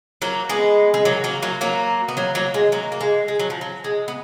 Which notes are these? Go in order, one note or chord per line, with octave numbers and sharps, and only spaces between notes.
F#3 A#3
G#3 B3
G#3
F#3 A#3
F#3 A#3
F#3 A#3
F#3 A#3
B3
F#3 A#3
F#3 A#3
G#3
F#3 A#3
A#3
G#3
G#3
F#3
F3
F#3
G#3
B3